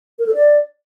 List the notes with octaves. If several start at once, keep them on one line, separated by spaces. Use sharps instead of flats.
A#4
A4
D5